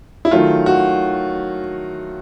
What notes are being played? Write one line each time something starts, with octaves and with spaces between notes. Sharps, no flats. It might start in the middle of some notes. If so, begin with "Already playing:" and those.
E4
D#3 F#3 A3 F4
F#4